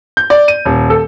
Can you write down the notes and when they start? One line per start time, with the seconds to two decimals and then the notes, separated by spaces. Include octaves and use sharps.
0.17 G6
0.30 D5
0.48 D#7
0.65 D#1
0.90 A4